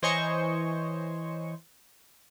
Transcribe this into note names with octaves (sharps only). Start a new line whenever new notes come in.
E3 C5 C#5 D#5 G#5 C#6